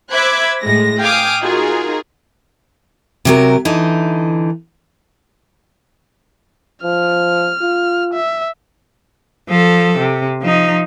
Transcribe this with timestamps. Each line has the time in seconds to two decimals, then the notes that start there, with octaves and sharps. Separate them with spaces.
0.12 C5 E5 B5 D6 F#6 G#6
0.63 A2 G#3 A#6
1.00 F5 G5 G#5 D6 D#6 F6
1.44 D#4 F4 F#4 G#4 A#4
3.25 C3 F#3 A#4
3.65 D3 E3 D#4
6.84 F3 F6
7.61 F4
8.13 E5
9.49 F3 A4
9.98 C3
10.41 F3 D#4